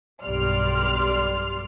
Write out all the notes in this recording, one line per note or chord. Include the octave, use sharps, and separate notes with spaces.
B1 G2 G3 D5 C6 F6